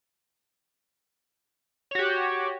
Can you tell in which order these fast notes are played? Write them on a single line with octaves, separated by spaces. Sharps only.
C#5 F#4 G4